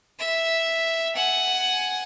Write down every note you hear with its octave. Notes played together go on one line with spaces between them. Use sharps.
E5
F#5 G#5